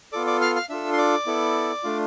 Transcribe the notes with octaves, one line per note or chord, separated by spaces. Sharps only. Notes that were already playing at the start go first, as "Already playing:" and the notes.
B3 F4 A4 D5 D6
D5 D6
F5 F6
F5 F6
D4 F4 A4 E5 E6
C6
D5 D6
B3 E4 A4
A3 D4 F4